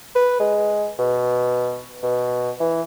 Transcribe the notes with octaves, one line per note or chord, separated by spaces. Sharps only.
B4
G#3
B2
B2
E3